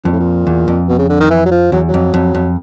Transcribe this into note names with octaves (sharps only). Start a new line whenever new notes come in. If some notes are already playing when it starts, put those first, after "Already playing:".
F2 A#2
A2
A#2
E2
F2
B2
C#3
D3
D#3
E3
F#3
F3
E2 F#3
F#3
F2
F2
F2